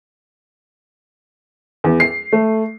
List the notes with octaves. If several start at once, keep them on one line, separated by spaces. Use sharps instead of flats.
E2
C7
A3